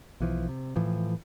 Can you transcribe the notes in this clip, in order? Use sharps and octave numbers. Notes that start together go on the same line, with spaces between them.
B1 E3 F3
C3
A2 E3 F3